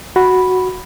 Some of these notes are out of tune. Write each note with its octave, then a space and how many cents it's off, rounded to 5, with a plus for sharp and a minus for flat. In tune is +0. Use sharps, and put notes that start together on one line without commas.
F#4 +0 B5 +0